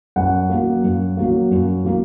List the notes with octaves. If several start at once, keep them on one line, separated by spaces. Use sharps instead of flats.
F#2 F#5
F#3 A#3
F#2
F#3 A#3
F#2
F#3 A#3